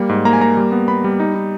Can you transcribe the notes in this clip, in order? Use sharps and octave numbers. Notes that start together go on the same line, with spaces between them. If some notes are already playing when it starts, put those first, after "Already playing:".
Already playing: G3 A#3
G#2
A#3 A#5
G#5
A#3 A#5
G3
B3
B3 B5
G3
D#4
D#4